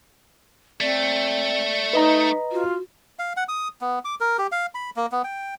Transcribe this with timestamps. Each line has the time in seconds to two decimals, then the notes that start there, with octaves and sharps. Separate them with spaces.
0.81 A3 C4 D5
1.93 D#4 B4 D#5 A#5
2.51 F4 F#4
3.19 F5
3.37 F#5
3.48 D#6
3.81 B3
4.05 D6
4.20 A#4
4.38 G4
4.52 F5
4.75 B5
4.96 A#3
5.12 B3
5.24 G5